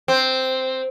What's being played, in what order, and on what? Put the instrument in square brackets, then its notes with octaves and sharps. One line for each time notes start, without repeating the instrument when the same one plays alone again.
[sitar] C4